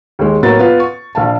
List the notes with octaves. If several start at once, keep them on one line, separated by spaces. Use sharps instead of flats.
D#2 G#3
A2 F#3 A#3 B3 A#4 A6
B3 F4 B4
C#6
A#1 F5 A5